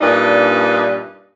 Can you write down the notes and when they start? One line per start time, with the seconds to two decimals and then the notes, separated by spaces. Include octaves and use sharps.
0.01 G2 A#2 D4 D#4 B4